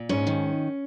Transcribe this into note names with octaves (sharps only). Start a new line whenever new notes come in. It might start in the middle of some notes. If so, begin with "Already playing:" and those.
Already playing: A#2
G#2 C#4
D#3